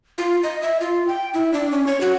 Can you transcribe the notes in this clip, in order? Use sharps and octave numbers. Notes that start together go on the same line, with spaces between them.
F4
D#5
E5
F4
G5
E4
D4
C#4
C#5
F#4